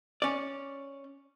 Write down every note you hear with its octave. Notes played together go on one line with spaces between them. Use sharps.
C#4 D5